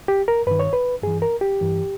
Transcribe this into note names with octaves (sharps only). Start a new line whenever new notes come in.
G4
A#4
G2 D#3 B4
C#5
B4
G2 E3 G#4
A#4
G4
G2 E3